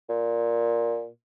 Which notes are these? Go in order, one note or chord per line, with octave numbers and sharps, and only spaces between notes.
A#2